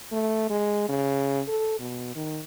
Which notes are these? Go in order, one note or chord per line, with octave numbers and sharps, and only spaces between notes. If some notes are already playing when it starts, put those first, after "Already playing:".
A3
G#3
C#3
A4
B2
D#3